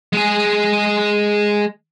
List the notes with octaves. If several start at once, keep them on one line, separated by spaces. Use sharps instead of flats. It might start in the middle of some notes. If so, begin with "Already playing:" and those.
G#3 G#4